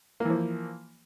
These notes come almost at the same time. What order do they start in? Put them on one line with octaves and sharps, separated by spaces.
A#3 E3 F3